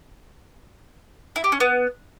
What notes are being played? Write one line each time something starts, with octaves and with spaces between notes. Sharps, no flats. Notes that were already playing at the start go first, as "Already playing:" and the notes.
E4
G4
C#4
B3